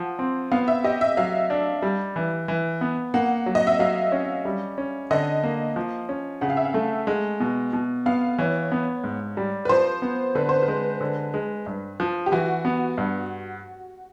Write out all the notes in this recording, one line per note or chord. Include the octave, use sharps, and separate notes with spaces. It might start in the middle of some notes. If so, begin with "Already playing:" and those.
Already playing: F3 F#5
C4
B3 F5
E5
G4 D#5
E5
F#3 F5
D4
G3
E3
E3
B3
A#3 F#5
F#3
D#5
E5
F#3 F5
C#4
G3
C#4
D3 D#5
A#3
F3
C#4
C#3 F#5
F5
E5
F5
A3
G#3
B2
B2
B3 F5
E3 C#5
B3
G#2
G3
B4
F3 C5
B3
D3 B4
C5
B4
G#3
D3
G#3
G2
F3
G4
E3 F#4
B3
G2